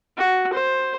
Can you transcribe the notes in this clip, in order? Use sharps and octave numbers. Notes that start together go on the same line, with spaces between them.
F#4
C5